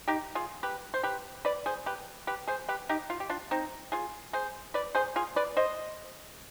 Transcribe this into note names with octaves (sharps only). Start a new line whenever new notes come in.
D#4 G4
F4 G#4
G4 B4
C5
G4 B4
B4 D5
G#4 C5
G4 B4
G4 B4
G#4 C5
G4 B4
D#4 G4
F4
G4
D4 F4
C4 D#4
F4 G#4
G#4 C5
B4 D5
G#4 C5
F4 G#4
B4 D5
C5 D#5